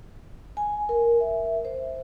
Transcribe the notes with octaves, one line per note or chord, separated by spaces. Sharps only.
G#5
A#4
E5
C5